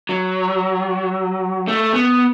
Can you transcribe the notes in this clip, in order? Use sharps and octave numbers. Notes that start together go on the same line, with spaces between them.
F#3
A3
B3